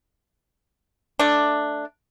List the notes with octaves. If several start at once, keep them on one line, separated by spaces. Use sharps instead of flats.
A3 D4